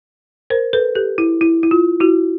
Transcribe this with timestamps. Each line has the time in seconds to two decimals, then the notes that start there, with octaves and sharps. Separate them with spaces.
0.50 A#4 C5
0.73 A4 B4
0.95 G4 A4
1.18 E4
1.41 E4
1.63 E4
1.71 F4
2.00 E4 F#4